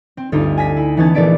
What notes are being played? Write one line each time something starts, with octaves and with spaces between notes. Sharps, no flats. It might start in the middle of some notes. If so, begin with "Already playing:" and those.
C4
G1 D2 C4 D#4 F4
G#5 A#6 B6
E4
E3 B3 C#4 D#4 A5 G#6
A#1 E3 A3 D5 B6 D7